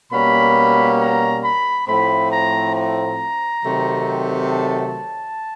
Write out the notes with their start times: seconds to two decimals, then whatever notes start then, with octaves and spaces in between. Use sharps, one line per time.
0.12 B2 G3 A#3 C#4 B5
1.00 A#5
1.44 B5
1.88 A2 F3 A3 C4 B5
2.32 A#5
2.76 A#5
3.64 C3 D#3 F#3 A3 C4
4.52 A5